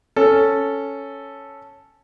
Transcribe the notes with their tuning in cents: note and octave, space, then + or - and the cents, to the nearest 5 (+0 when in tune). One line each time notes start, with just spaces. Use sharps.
C#4 +0 A4 +0